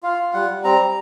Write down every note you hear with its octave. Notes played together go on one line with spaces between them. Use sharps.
F4 F5
F4
G3 F#5
G3
C4 A#5
G3